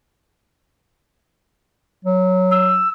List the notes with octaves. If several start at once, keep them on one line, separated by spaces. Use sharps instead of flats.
F#3
E6